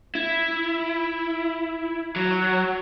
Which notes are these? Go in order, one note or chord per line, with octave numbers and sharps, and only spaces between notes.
E4
F#3